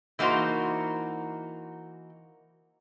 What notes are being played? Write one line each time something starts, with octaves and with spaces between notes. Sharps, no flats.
E3 A#3 D#4 F#4 C5